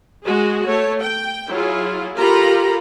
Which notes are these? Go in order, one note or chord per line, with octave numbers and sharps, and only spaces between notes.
G#3 F#4 G#4
A3 C#5
G5
F#3 E4 F4 G#4
F4 G4 A4 A#4 A#5 B5